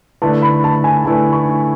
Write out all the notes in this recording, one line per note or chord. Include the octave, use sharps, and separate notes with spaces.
D3 A3 E4 B4 A5
B5
A5
G#5
D3 A3 E4 B4 A5
C#6